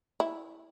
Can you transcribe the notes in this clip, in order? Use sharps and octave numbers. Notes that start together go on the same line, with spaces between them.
E4